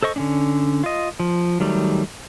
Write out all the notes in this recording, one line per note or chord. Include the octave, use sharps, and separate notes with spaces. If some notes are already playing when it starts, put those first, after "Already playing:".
A4 C5 D#5 C#6
D3 C#4 D4
F4 D#5
F3
D#3 F#3 G3 A3